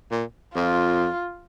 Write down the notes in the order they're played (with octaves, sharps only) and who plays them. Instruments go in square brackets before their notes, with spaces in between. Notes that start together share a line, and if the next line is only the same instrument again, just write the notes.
[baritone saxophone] A#2
[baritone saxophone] F2 [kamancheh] F4